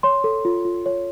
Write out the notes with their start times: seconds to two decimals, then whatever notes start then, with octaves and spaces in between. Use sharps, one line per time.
0.03 C#5 C6
0.24 A4
0.45 F4
0.65 F4
0.86 C#5